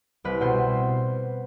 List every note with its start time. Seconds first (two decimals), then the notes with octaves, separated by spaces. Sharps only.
0.24 C2 B4
0.41 B2 C5